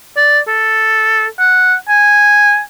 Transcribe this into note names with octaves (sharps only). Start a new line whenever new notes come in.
D5
A4
F#5
G#5